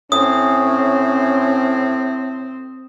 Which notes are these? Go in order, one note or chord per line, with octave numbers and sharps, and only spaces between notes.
A2 C4 C#4 D#6